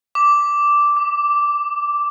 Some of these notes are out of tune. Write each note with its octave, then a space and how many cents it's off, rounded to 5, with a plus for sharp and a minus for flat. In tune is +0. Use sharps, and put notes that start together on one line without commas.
D6 -5
D6 +20